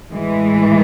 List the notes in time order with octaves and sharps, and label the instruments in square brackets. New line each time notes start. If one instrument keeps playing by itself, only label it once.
[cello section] A2 E3 G#3